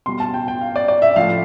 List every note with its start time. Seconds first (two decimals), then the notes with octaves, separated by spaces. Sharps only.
0.06 B2 G3 C6
0.20 A5
0.34 G5
0.48 G5
0.61 F5
0.76 D5
0.88 D5
1.02 E5
1.16 A2 F3 F5